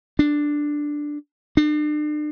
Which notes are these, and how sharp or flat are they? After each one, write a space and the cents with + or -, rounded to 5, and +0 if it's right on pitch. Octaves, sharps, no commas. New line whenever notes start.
D4 +5
D4 +40